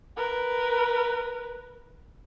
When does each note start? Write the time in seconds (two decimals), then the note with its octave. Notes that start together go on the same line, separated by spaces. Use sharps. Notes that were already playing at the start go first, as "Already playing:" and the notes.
0.17 A#4 B4